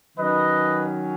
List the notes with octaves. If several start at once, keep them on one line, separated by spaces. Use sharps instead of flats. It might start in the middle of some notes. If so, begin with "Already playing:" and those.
D#3 F#3 C#4 B4 D#5